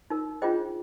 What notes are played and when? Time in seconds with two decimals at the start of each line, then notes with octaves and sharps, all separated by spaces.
0.10 D#4 A#4
0.42 D4 F4 G#4 C5 D#5 G5